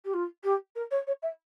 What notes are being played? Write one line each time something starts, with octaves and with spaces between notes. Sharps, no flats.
G4
F4
G4
A#4
C#5
C#5
E5